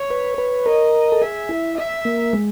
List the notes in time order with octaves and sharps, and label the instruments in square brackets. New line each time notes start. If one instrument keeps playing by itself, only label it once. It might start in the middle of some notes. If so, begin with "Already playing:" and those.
Already playing: [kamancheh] C#5
[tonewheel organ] B4
B4
[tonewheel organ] A#4 [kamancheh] D#5
[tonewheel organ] A4
[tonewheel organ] G#4 [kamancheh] E5
[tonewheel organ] E4
[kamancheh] E5
[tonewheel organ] A#3
G#3